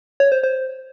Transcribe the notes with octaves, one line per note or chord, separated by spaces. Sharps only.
C#5
C5
C5